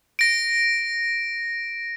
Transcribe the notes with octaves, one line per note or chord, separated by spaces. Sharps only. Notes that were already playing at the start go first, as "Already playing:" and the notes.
A#6 D7